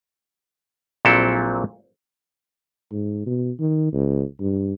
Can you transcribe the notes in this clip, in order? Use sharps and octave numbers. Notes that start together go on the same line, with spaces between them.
A#1 A#2 F#3 C4 E4 A4
G#2
B2
D#3
C#2
G2